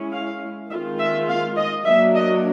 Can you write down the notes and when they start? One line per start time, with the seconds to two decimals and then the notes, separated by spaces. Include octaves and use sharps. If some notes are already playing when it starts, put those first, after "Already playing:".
Already playing: G#3 C#4 E4
0.13 F5
0.70 D#3 G#3 C4 F4 E5
1.00 E5
1.28 F5
1.57 D#5
1.86 F#3 A#3 D4 E5
2.15 D#5